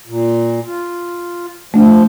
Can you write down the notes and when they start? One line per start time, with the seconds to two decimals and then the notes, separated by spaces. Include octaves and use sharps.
0.07 A#2
0.66 F4
1.74 F3 A3 D4